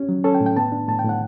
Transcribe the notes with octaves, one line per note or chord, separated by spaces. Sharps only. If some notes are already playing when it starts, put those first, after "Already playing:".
Already playing: C#4 G4
F#3
C#4 A4
G5
A2
G5
B3 A5
D4
A2 A5
G5
A2 F#5